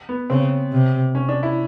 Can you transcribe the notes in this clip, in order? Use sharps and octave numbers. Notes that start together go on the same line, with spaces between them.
B3
C#3 C4
C3
C#4
D4
E4